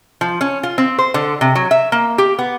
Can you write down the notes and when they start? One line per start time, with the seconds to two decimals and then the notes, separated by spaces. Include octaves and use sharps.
0.21 F3
0.41 C#4
0.63 F4
0.78 C4
0.98 C5
1.14 D3
1.41 C3
1.55 F#3
1.71 E5
1.92 A#3
2.18 G4
2.39 B3